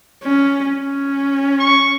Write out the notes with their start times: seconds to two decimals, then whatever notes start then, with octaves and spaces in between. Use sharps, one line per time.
0.23 C#4
0.76 C#4
1.60 C#6